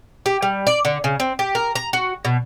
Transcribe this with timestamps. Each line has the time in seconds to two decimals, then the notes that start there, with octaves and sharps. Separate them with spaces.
0.26 G4
0.42 G3
0.67 D5
0.85 D3
1.04 C#3
1.20 C4
1.39 G4
1.55 A#4
1.76 A#5
1.93 F#4
2.25 B2